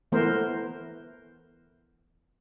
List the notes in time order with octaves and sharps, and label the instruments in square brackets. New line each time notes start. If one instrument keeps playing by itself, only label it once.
[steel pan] E3 A3 B3 A#4 C5